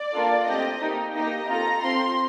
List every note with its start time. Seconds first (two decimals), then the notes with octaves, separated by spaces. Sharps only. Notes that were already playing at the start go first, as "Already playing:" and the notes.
Already playing: D5
0.13 A#3 D4 F4 A4
0.46 A3 C4 G4 D#5
0.81 A#3 D#4 G4
1.14 A#3 D#4 G4 D#5
1.48 C4 F4 A4 A#5
1.83 C4 F4 A4 C6